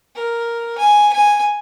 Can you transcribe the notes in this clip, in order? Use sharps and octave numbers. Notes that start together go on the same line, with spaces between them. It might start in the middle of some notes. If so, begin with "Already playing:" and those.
A#4
G#5
G#5